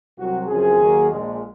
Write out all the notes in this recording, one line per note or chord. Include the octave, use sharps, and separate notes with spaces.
C2 C3 F#3 C4 F#4
F#2 C#3 F3 C4 G#4
D#2 D#3 F#3 A#3
A#1 A#2 G#3